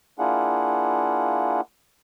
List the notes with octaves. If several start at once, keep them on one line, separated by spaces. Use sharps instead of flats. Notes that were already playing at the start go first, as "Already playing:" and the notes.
A#3 D4 E4 F4 G#4 F#5